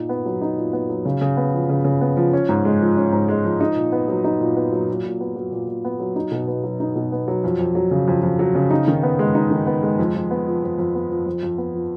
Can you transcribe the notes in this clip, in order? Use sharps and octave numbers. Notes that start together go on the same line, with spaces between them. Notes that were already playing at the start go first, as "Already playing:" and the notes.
Already playing: A#2 D#4
B3
F#3
D#4
A#2
B3
F#3
C#3
C#3
B3
F3
C#3
C#3
B3
F3
C#4
G#2
G#3
F3
C#4
G#2
G#3
F3
D#4
A#2
B3
F#3
D#4
A#2
B3
F#3
A#2
A#2
B3
F#3
A#2
A#2
B3
F#3
D#4
B2
B3
F#3
D#4
B2
B3
F#3
F2
F2
F#3
C#3
F2
F2
F#3
C#3
D#4
D#3
B3
G#3
D#4
D#3
B3
G#3
F2
F2
B3
F3
F2
F2
B3
F3
F2
F2
B3
F3